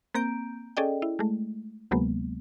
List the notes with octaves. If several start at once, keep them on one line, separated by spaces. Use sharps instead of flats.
A#3 C4 A#5 G6 D7
C#4 G#4 A4 D5 D#5 G5
E4
G#3 A3
D2 C3 F#3 G#3 A#3 B3